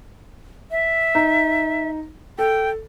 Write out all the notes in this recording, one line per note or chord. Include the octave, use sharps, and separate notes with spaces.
E5
D#4
A4 G5